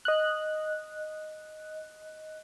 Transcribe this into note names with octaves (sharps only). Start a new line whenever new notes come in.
D#5 F#6